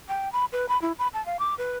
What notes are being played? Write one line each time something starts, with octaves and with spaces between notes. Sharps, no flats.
G5
B5
B4
B5
E4
B5
A5
F5
D6
B4